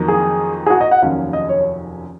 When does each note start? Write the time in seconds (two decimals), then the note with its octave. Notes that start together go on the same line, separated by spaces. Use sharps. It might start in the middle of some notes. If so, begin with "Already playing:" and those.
Already playing: F2 D#3 F#3 A#3
0.08 G#4
0.66 G#4
0.70 F#4
0.81 D#5
0.91 F#5
1.02 F1 D#2 D#3 F#3 C#4 F5
1.33 D#5
1.49 C#5